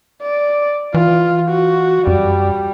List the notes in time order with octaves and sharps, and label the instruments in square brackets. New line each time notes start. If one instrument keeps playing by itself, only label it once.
[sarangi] D5
[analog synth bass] E3 [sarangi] F4
[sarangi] F#4
[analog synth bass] F#2 [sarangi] G3